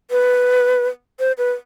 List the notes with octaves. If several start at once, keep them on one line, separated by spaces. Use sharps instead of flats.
B4
C5
B4